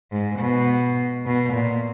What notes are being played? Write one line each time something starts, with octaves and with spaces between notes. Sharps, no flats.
G#2
B2
B2
A#2